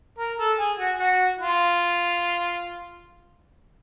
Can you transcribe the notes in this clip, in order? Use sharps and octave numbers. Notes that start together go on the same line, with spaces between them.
A#4
A4
G#4
F#4
F#4
F4